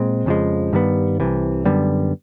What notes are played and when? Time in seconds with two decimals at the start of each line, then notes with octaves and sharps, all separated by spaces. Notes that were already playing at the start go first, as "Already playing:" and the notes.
Already playing: A#2 G#3 C4
0.26 F2 C#3 F3 G#3
0.73 G2 D#3 G3 B3
1.20 C2 C3 E3
1.65 F#2 D3 G3 B3